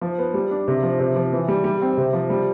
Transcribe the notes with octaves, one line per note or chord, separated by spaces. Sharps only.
F3
B3
G3
D4
C3
F3
C3
F3
E3
G3
G3
C4
C3
F3
G3